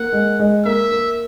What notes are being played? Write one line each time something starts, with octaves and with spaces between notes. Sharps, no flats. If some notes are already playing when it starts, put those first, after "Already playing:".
Already playing: A#3 F#5
G#3
G#3
A#3 E5
A#3